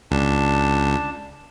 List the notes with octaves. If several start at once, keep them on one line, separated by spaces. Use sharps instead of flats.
C#2 D4 A5